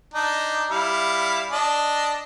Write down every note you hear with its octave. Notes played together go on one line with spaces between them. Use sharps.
D4 D#4
G3 E4 F5
D4 D#5